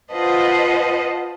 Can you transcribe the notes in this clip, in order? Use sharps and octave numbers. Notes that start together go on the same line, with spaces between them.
F4 B4 C5 D#5 F#5 A5